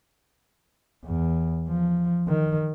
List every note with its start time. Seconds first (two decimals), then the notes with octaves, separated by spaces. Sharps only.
1.05 E2
1.68 F3
2.28 D#3